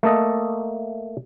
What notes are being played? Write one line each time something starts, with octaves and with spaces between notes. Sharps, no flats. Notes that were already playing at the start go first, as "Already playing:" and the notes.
A3 A#3 A4 D#5